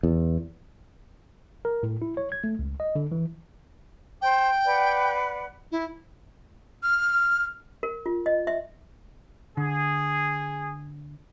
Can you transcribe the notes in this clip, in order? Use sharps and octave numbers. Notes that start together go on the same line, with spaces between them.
E2
A#4
A2
E4
C#5
G#6
A3
C#2
D#5
D3
E3
C5 G5
B4 D5 F#5
E4
F6
A#4
F4
D#5
E5
D3 G#4